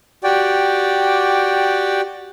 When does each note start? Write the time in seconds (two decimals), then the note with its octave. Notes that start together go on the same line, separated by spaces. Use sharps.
0.24 F#4 G4 D5 G5